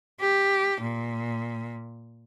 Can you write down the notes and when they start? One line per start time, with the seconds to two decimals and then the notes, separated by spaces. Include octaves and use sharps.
0.20 G4
0.81 A#2